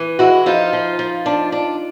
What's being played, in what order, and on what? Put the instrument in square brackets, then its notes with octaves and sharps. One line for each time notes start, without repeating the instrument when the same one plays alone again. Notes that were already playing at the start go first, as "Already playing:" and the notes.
Already playing: [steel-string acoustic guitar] E3
G#3 E4 F#4
F3 D#4 F4
F3
F3
D4
D4